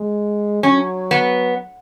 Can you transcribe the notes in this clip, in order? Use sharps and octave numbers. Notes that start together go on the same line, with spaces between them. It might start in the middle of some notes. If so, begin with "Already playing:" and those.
Already playing: G#3
F#3 C#4
B3